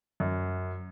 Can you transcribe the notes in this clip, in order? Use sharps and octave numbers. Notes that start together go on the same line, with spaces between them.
F#2